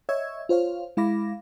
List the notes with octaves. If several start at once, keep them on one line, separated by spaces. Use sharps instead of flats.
C#5 D#5 E5 C#6 E6 G#6
F4 C5 C#5 F5
G#3 E4 F5 B5 D6 A#6